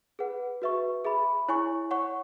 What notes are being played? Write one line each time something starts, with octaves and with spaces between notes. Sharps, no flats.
G#4 B4 F#5
F#4 B4 E5 C#6
G#4 E5 B5
E4 C#5 G#5 C#6
C#5 F#5 C#6